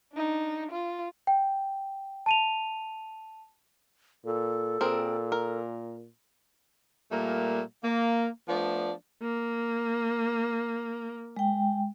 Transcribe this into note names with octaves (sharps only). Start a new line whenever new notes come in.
D4 D#4
F4
G5
A5 D#7 F7
A#2 A4
A#2 C4 G#4 A#4
A#4
A#2 G3 A3 A#3
A#3
F3 A3 B3 D4 D5
A#3
G#3 G5